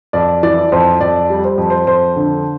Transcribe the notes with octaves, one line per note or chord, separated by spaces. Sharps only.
F2 D5
E3 D5
F2 C5
F2 D5
G3
C5
F2
C5
F2 C5
D3